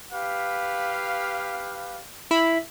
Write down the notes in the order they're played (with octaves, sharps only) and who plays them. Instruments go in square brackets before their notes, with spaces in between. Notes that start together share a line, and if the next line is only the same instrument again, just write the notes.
[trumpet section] G4 B4 F5
[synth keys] E4 B5